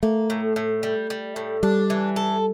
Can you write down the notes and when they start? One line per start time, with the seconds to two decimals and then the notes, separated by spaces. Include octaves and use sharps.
0.03 A3 A#3
0.30 A2
0.56 A2
0.83 G3
1.10 G3
1.36 A2
1.63 G3 D4
1.90 E3
2.16 A4